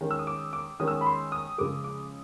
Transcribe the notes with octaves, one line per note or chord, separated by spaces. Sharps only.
D#3 G#3 C#4
E6
D#6
D6
D6
D#3 G#3 C#4 D#6
E6
D#6
B5
C6
D#6
C#3 F3 G#3 D6
D6